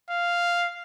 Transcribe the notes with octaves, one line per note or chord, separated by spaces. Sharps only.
F5